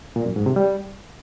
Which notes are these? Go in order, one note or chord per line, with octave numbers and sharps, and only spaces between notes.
A#2
F#2
G#2
C3
G3